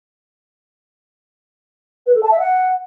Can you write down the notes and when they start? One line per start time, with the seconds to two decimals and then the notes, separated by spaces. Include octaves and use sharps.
2.06 B4
2.14 A4
2.22 A5
2.31 E5
2.39 F#5